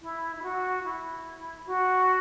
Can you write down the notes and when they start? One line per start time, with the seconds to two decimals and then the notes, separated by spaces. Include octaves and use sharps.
0.02 E4
0.36 E4
0.42 F#4
0.84 E4
1.66 F#4